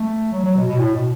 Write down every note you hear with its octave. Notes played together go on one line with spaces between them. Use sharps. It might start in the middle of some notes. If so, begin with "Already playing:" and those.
Already playing: A3
F#3
F#3
B2
B2
A2
B2